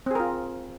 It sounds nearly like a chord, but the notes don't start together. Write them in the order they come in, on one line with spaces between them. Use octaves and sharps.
C4 G#4 A#4 F4